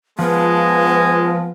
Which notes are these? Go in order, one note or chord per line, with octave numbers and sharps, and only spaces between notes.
F3 G#3 B3